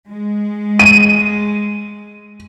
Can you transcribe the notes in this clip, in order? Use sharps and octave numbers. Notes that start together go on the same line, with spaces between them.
G#3
D#7